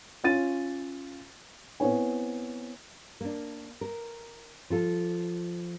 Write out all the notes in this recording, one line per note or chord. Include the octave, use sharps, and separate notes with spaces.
C#4 F4 A6 D#7
B3 C4 E4 C#5 G#5
A#3 D4
A#4
F3 F4 A4